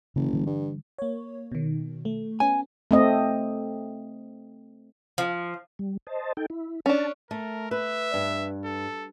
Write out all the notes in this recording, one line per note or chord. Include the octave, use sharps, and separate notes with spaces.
F#1 C#3 E3
D3 E3 G3
G2
A#3 C#5
B2 D#3
A3
B3 C#4 G#5
A3 C4 D#5
F3
G3
C5 D#5 A5
D#4 A4 G5
E4
C#4 D4 A5
A3 A#4
B4 E5
G2
A4